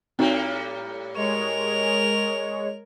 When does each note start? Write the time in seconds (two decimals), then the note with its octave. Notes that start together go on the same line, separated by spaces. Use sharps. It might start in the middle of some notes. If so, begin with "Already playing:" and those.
0.19 A2 G3 A#3 C4 D#4 F#4
1.14 G#3 A#4 C#5 F7